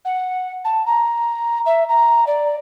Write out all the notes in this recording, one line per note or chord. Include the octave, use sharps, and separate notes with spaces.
F#5
A5
A#5
E5
A#5
D5